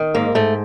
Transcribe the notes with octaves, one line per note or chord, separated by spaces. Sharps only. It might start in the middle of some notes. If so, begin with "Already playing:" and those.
Already playing: D#3
G#2 A#3
G#2 A3